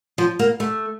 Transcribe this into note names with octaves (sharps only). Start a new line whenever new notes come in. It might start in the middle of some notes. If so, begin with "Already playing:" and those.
F3
A#3
A3